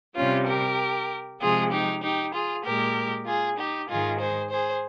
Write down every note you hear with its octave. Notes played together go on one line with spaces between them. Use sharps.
C3 G3 C#4 F4
G4 A#4
C3 F3 G#3 F4 G#4
D#4 G4
D#4 G4
F4 G#4
A#2 G#3 G4 A#4
F4 G#4
D#4 G4
G#2 D#3 G#3 F4 G#4
G#4 C5
G#4 C5